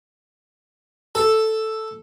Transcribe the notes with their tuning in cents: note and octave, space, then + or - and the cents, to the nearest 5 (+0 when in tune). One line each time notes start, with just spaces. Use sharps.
A4 +0